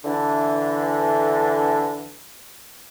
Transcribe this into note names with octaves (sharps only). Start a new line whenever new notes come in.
D3 E3 D4